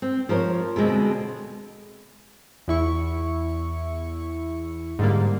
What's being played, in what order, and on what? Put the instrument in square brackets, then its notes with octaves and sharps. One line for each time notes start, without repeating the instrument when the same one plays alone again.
[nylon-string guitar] C4
F3 A#4 C5 C#5
B2 D3 G#3 C4
[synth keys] E2 E4 C#6
G#2 D3 G3 A#3